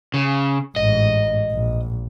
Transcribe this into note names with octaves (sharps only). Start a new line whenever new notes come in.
C#3
A1 G#2 D#5
A#1